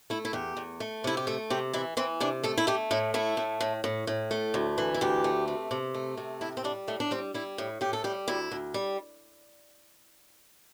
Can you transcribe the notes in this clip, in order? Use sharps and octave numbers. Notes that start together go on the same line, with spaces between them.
A3 E4
E4
E2 G4
E2
A3
C3 E4
G4
A3 A4
C3 G4
E3 E4
E3 C4
C3 D4
A3 A4
E4
A3 G4
A2 E4
A3 E4
A2
A2
A2
A2
A3
D2
E3
E4
D2 G4
A3
C3
C3
A3
C3
A2 E4
C4
G3 D4
A2 A3
D4
G3 C4
G3 E4
A2
A2 G4
A4
G3 G4
D2 E4
D2
G3